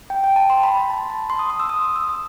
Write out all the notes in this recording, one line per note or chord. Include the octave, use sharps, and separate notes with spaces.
G5
G5
A5
C6
B5
A5
A5
A5
C6
D#6
D#6
E6
D#6
D#6
E6
D#6